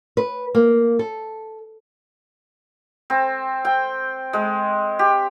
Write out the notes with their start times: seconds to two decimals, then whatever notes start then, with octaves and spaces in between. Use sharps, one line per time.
0.17 B4
0.55 A#3
0.99 A4
3.10 C4
3.65 G5
4.33 G#3
4.99 G4